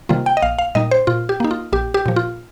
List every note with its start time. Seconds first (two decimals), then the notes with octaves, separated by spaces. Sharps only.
0.09 C3 D#3 G3 A#3 F4
0.26 G5
0.37 D#5
0.42 A#1 F5
0.59 F5
0.75 A#2 G3 D#4 D#5
0.91 C5
1.07 A#2 F4
1.29 G4
1.40 A#3 D#4
1.51 F4
1.73 A#1 G4
1.94 G4
2.06 A#2 F3
2.16 F4